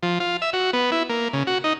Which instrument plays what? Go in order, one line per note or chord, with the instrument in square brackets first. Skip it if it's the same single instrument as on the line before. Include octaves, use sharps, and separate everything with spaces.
[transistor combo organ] F3
F4
E5
F#4
B3
E4
A#3
C#3
F#4
D#4